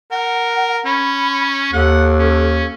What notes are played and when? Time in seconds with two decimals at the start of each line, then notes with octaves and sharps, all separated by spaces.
0.11 A#4 F#5
0.85 C#4 B5
1.73 D#2 A4 F#5
2.19 C#4